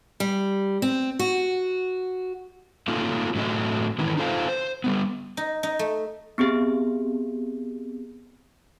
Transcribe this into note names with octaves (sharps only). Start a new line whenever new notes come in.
G3
C4
F#4
A3 A#3 C#4 D#4 F4 A4
A2 F#3 A3 C#4 D#5
D#3 E3 C#4 E4
D#4 F4 A4 C5 E5 F5
C5
G3 B3
D#4
D#4
A3
B3 C4 G4 G#4